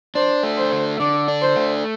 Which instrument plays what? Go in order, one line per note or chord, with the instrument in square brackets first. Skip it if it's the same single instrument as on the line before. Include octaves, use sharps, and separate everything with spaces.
[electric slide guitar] D4 [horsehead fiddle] C5
[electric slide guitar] A3
[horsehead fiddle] C5
[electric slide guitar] D3
[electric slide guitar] D3 [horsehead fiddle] D5
[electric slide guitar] D4
[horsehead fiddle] C5
[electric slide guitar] A3